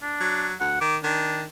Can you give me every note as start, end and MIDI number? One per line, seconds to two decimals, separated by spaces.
0.02 0.48 62
0.20 0.54 54
0.60 0.78 38
0.60 0.80 78
0.81 0.98 51
0.81 0.97 86
1.04 1.45 51
1.04 1.43 62